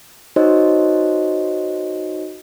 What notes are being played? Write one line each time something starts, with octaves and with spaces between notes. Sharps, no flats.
D#4 F#4 C5 C#5 D#5